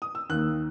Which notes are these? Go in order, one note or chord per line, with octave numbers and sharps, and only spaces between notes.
D#6
E6
D#2 D#3 A#3 F#6